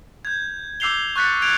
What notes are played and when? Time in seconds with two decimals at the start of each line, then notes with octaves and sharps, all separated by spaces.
0.25 G6 G#6
0.80 D6 E6 G6 C7 F7 G7
1.16 C#6 F#6 G6 A6 B6 C#7
1.42 G6 G#6 D7 F7